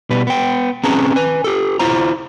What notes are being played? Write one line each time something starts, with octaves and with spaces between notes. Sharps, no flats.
B2 G3 B4
B3 G5
C4 C#4 G#4 B4 A5 A#5
B4 G#5
G4 A4
E4 F4 C5 A#5